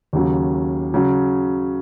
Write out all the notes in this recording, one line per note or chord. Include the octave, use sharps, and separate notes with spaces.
D#2 C#3 F#3
C#3 F#3